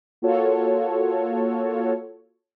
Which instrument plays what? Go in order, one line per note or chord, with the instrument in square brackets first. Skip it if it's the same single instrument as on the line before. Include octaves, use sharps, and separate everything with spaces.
[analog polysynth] A#3 F4 F#4 A4 C#5